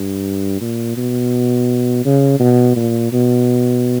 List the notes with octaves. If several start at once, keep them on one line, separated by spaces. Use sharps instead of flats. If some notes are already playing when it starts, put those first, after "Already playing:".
Already playing: G2
A#2
B2
C#3
B2
A#2
B2